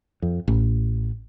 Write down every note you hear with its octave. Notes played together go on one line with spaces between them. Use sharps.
F2
A1